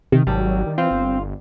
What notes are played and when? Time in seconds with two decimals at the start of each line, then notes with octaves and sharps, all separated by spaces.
0.12 C3 D#3
0.27 G#1 F#3 G3
0.66 D#3
0.78 E3 C4 F4
0.91 G1